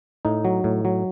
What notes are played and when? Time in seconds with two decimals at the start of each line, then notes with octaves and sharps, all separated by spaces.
0.25 A2 D#4
0.45 F#3
0.64 A2
0.85 F#3